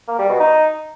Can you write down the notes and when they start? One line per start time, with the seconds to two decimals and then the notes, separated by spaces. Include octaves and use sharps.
0.08 A#3
0.19 G3
0.29 B2
0.40 D#4